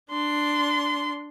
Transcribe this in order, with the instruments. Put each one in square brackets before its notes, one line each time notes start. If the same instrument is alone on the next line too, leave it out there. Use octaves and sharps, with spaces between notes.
[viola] D4 C6